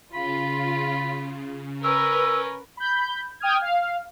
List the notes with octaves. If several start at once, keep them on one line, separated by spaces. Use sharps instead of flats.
C#3 F4 B5
C#4 A#4 B4 E6
B5 G6
G5 D#6 F6 G#6
F5